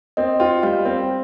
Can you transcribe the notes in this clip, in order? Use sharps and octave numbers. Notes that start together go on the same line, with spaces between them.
C4 D#5
F4 G5
G3 F5
C4